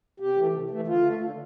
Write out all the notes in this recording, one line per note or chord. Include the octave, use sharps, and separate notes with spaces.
C3 G4
E3 A3
C3
E3 A3
D3 F4
A3
D3